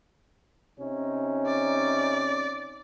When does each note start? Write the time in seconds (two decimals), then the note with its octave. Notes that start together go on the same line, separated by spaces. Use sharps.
0.78 C3 C#4 D#4
1.46 D5